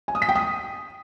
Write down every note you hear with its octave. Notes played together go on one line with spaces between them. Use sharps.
G#5
D#6
B6
G5
D#6